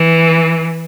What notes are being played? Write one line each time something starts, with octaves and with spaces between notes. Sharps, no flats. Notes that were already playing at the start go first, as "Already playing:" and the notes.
Already playing: E3